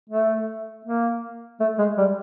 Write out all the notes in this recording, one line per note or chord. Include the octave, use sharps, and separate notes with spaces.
A3
A#3
A3
G#3
G3